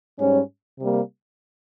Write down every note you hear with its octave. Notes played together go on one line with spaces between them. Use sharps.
G#2 G3 C#4
C3 G3 A#3